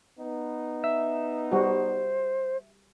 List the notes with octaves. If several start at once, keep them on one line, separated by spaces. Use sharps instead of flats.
B3 D#4
E5
G3 F#4 C5